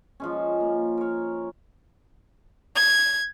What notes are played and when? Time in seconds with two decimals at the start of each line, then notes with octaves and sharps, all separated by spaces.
0.20 F3 G#3 C#4
0.60 A#3
0.97 A#4 C#5
2.76 G#6